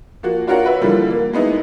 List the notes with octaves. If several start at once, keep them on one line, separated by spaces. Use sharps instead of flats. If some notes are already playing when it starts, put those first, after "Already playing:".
F3 A#3 F#4
D4 F4 F#4 A#4 C#5 F#5
F#4 B4 E5
D3 E3 F3 G3 A#3
A#3
G#3 B3 D#4 E4